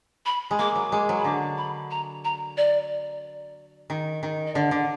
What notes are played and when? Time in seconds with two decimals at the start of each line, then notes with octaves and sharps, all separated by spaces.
0.26 B5
0.51 G#3
0.59 A#3 D6
0.75 F#3
0.92 G#3 D6
1.09 F#3
1.19 B5
1.24 D3 D6
1.57 B5
1.91 A#5
2.24 A#5
2.57 D5
3.90 D#3
4.23 D#3
4.47 D#5
4.55 D3 D5
4.71 D3